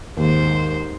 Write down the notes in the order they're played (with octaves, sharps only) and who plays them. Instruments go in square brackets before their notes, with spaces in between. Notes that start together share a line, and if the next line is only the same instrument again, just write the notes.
[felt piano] D#2 [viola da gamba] G#2 C5